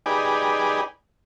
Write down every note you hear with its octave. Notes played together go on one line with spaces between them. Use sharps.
D#4 G4 G#4 B4 D5